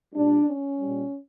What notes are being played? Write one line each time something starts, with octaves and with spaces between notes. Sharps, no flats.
A#2 G3 D4
C#4
A#2 G3